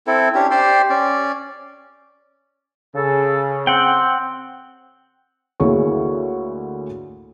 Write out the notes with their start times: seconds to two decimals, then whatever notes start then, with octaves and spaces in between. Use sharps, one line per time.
0.07 C4 E4 A4
0.35 C#4 D4 G4
0.51 G4 C5 D5 C6
0.90 C#4 D5
2.95 C#3 A4
3.67 C4 F#5 G5
5.60 D2 A#3 E4 G#4 C#5 C#6